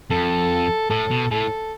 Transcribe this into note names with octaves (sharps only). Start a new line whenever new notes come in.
F2 A4
A2 A4
B2
A2 A4